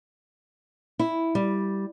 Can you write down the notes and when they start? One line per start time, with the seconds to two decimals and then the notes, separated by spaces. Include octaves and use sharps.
0.99 E4
1.35 G3